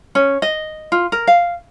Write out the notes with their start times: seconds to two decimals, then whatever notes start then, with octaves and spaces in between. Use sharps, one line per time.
0.15 C#4
0.42 D#5
0.92 F4
1.12 A#4
1.27 F5